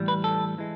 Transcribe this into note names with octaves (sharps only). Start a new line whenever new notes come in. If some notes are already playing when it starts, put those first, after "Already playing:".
Already playing: A2 E3 G3
B4
A4
E3 G#3